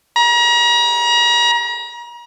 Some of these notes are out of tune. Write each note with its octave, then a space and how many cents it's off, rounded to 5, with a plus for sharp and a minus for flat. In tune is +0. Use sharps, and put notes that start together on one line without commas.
A#5 +40